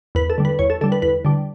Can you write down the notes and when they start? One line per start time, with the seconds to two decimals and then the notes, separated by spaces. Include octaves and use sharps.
0.15 E2 B4
0.30 A4
0.38 D3 G3
0.45 B4
0.59 E2 C#5
0.70 A4
0.81 D3 G3 A4
0.92 B4
1.02 E2 B4
1.25 D3 G3